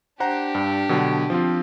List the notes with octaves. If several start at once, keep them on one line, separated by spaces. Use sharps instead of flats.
D4 G4 C5 F#5 A#5
G2
B2 D3 F#3
F3 C4 F4